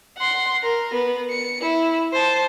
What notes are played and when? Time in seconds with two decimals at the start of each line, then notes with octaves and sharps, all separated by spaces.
0.18 F#5 C6
0.63 A#4
0.93 B3
1.30 C#7
1.62 E4
2.13 C5 A5